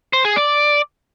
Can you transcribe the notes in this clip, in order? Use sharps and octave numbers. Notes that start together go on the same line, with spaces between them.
C5
G#4
D5